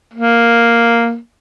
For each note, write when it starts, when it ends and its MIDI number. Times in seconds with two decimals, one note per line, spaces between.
0.14 1.16 58